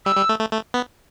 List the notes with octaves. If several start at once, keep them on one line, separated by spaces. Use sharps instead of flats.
G3 E6
G3
A3
A3
A3
B3